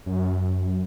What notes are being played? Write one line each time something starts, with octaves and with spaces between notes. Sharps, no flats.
F#2